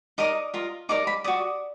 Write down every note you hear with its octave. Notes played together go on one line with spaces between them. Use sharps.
D#4 A#4 D5 D#6
F4 A#4 D#5
D#4 A#4 D5 D6
B5
F#4 D5 D#6